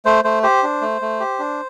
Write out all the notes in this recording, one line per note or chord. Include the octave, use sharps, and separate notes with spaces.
A3 C5
A3 C5
G4 C5
D4
A3
A3
G4
D4